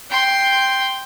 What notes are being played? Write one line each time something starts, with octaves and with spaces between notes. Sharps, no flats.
G5 C6